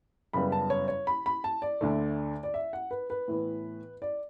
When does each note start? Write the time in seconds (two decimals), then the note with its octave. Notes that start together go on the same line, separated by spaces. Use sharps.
0.33 F#2 C#3 G3 B3 B5
0.52 A5
0.70 C#5
0.88 C#5
1.07 B5
1.26 B5
1.44 A5
1.62 D5
1.81 D2 D3 A3
2.43 D5
2.54 E5
2.73 F#5
2.91 B4
3.10 B4
3.28 A2 E3 B3
4.02 D5